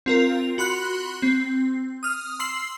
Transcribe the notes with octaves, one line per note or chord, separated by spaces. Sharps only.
C4 F4 A#4
F#4 B5 C6 F#6
C4
D#6 F6
C6 E6 C7 F#7